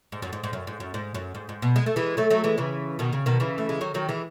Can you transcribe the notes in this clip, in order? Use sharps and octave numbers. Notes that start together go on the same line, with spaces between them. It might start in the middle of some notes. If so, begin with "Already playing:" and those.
G#2
F#2
G#2
G#2
F#2
G#2
F#2
G#2
F#2
G#2
G#2
B2
G#3
A3
E3 G#3
F#3 A3
F#3 A3
E3 G#3
C#3 E3
B2 D#3
C#3
B2 D#3
C#3 E3
A3
G#3
D#3 F#3
D#3 F#3
E3 G#3